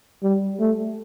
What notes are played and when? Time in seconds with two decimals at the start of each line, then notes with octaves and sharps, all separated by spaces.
0.23 G3
0.60 A3